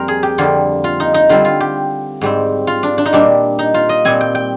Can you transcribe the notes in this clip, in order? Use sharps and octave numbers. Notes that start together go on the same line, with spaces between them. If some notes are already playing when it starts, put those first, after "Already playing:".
Already playing: F2 G3 A#3 A#4 C5 D5
G#4
G4
F2 D3 G3 A#3 F4
F4
D#4
D#4
D3 G3 C4 F4
F4
G4
G#2 G3 C4
F4
D4
D4
D#4
A#2 G3 A#3 D4
D#4
F4
D#5
A#2 G3 C4 G#5
G5
G5